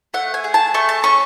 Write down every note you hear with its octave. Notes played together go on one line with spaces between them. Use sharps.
A3 F#5
G#5
G#4
A5
A3 C#6
A5
C#4 C#6